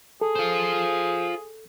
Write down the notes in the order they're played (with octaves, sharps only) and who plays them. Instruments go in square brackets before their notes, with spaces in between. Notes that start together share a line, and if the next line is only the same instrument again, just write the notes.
[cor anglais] G#4 [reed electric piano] A4
[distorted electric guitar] F4 C5